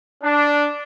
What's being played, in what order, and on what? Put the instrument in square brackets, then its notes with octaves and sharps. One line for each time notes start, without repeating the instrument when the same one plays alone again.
[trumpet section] D4